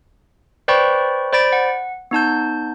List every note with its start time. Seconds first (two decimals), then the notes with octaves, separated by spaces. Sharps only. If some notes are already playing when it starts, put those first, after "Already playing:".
0.68 B4 C5 D5 G5 B5 C#6
1.33 C5 D5 B5 A6 D7
1.53 F#5
2.11 B3 D#4 A5 G6